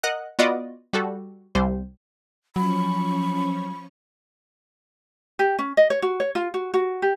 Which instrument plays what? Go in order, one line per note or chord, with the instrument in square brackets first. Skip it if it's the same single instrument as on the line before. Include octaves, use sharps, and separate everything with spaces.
[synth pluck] A#4 D#5 F#5 F#6
B3 F4 F#4 D5 D#5
G3 F#4 A4
C2 G3 C5
[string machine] F3 C#4 C#6 [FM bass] F#3 [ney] B5
[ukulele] G4
C#4
D#5
C#5
F#4
C#5
F4
F#4
F#4
G4